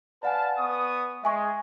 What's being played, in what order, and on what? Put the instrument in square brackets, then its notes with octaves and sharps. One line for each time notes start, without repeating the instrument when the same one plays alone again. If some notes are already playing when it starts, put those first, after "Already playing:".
[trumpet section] B4 F5 A5 [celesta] D5 F#5 G#5
[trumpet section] B3 C#6 D#6
[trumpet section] G#3 [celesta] E5 G#5 C#6